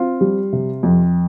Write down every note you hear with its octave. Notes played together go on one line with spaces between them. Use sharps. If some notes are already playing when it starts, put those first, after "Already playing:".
Already playing: C4 F4
G3
C3
F2